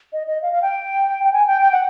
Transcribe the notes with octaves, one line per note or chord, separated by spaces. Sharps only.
D#5
D#5
F5
F5
G5
G5
G#5
G5
G5
F#5